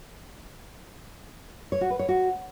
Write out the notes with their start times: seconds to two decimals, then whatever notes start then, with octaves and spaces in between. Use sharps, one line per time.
1.72 C#5
1.81 F#4
1.90 B4
1.99 C#5
2.09 F#4